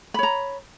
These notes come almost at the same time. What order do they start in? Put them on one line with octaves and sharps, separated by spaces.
B5 C#5 A#5